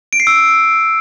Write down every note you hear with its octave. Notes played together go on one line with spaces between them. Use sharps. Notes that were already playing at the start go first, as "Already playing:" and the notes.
D7
C7
E6